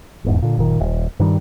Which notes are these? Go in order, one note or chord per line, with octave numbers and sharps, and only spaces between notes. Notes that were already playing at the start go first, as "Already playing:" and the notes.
D#1 E2 G#2
A#2 D3
F#1 A#2 D#3
D#1
G2 D#3 G3